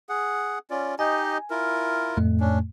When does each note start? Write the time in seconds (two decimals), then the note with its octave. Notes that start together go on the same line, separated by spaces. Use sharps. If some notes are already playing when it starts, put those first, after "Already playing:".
0.09 G#4 F#5
0.70 C#4 F4 D5
0.99 D#4 G4 D#5 G#5
1.50 E4 F4 A#4
2.17 F2 A2 A3
2.40 C#4 D4